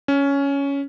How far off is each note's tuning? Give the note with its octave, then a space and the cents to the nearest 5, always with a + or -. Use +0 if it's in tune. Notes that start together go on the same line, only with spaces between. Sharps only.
C#4 +10